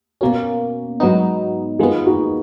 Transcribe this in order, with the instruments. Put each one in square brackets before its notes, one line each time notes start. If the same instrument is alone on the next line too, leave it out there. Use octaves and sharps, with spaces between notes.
[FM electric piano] B2 A#3 C#4 [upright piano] F#4 A#4
[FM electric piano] G#2 F#3 B3 D#4
[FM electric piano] D#3 G#3 B3 [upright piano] F4 G#4
[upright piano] D#4 F#4